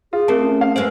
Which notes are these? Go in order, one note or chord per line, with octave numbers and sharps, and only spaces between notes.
F4 G#4
A3 C4 A#4 A5
C#4
F5
F#2 F#3 G#3 B4 C5